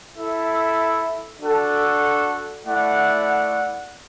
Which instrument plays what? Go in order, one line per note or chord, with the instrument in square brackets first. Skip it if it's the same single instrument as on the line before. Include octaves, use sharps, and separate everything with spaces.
[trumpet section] E4 A4 E5
D4 F#4 A4 F#5
A3 E4 D5 F#5